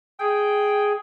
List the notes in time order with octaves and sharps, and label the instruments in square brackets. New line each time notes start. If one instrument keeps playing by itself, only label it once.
[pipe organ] G#4 [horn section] G5